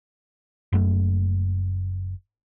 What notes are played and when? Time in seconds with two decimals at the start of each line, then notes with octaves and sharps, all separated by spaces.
0.73 F#1 F#2 A3